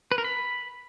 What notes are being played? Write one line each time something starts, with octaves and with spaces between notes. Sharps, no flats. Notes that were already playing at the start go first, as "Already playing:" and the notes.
B4
A#4
B5